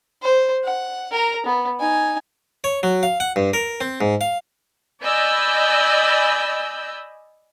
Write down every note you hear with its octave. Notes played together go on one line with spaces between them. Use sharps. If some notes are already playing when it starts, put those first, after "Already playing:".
C5
F#5
A#4 A#5
B3
D#4 G#5
C#5
F#3
F5
F#5
G2
A#4
C4
G#2
F5
D5 D#5 G#5 B5 E6 G6